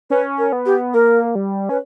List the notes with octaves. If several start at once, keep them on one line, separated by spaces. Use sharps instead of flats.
C#4 B4
A#4
B3
G4
A#3 A#4
G3
C#4 B4